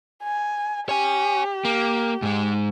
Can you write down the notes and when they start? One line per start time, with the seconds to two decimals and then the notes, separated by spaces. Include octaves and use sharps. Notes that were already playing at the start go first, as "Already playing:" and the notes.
0.23 G#5
0.89 G4 C#5 G#5
1.65 A#3
2.22 G#2 G#3